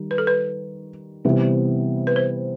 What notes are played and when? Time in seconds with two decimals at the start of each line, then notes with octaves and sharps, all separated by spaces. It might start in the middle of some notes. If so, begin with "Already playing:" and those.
Already playing: D#3 G3
0.11 B4
0.18 A4
0.27 B4
1.25 C3 E3 G3 B3
2.07 B4
2.16 C5